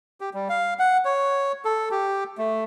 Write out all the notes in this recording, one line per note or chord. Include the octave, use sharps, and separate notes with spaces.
G4
G3
F5
F#5
C#5
A4
G4
A3